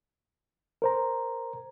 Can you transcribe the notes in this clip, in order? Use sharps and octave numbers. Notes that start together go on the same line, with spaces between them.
A#4 C5 A#5